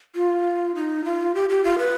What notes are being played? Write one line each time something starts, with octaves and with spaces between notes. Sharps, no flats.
F4
D#4
F4
G4
G4
F4
B4